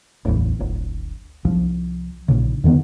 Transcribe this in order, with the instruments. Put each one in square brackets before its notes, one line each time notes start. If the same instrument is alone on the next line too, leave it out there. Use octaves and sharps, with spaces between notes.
[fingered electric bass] D1 A1 E2
D1 G1
C2 F3
A#1 A#2 C#3
E2 D3 D#3 B3